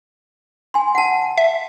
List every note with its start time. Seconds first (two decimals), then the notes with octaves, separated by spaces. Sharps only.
0.74 G#5 C6
0.95 F#5 A5
1.38 E5